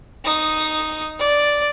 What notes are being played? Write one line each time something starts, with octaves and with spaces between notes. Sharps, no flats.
D#4 D#6
D5